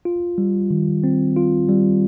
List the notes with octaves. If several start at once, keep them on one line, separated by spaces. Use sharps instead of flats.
F4
G3
D#3
C4
F4
G3